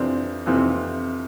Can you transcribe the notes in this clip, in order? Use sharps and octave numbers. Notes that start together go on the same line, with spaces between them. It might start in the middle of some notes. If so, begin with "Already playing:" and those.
Already playing: F2 C3 E3 C4 D4
F2 C3 E3